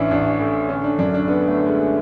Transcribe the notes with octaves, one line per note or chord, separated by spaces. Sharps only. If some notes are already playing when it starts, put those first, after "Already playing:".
Already playing: A1 E3 C#4 D4 E4
A1 D4
A2
D3 C#4
D4
F#2 D4
D4
D3 B3
A3
D3
G#3